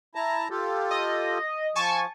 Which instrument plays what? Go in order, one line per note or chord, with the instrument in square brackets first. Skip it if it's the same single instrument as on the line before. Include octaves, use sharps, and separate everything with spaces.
[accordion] E4 A5 A#5
F4 G4 A4
[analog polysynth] D#5
[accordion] F3 [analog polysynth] G#5 A5 C#6